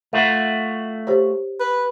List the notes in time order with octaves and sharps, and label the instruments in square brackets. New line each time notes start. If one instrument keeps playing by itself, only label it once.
[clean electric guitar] A3 F4 F#4 [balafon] E5
[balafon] G4 C5 C#5
[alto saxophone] B4